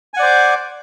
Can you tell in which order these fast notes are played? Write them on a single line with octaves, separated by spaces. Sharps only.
G#5 F#5 D5 C5 D6